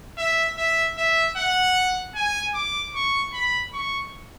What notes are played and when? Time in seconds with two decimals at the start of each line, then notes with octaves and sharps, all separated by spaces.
0.18 E5
0.57 E5
0.98 E5
1.37 F#5
2.15 G#5
2.54 D6
2.95 C#6
3.33 B5
3.73 C#6